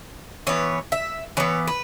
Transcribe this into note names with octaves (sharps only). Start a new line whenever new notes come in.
E3 B3 C#5
E5
E3 B3 C#5
B4